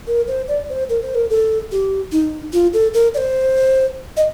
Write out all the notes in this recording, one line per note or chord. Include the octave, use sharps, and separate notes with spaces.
A#4
C5
D5
C5
A#4
C5
A#4
A4
G4
D#4
F4
A4
A#4
D5
C5
D#5